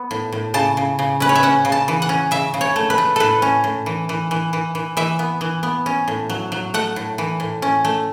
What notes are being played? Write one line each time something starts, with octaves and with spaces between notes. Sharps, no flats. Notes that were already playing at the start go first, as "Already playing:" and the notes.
Already playing: B3
A2
A2
C#3 A5
C#3
C#3
C#4 B4
C#5
E5
C#4 F#5
C#3
A5
E3
F#5
C#4
C#3 E5
C#3
C#5
A3
B4
A3
A2 A4 B4
C#4
A2
E3
E3
E3
E3
E3
E3 E5
B3
E3
B3
C#4
A2
F#3
F#3
A3 F#5
A2
E3
A2
C#4
A3